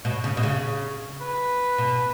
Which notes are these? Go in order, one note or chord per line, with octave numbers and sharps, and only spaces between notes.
B2 C#5
C#3
B2
C#3
B4
B2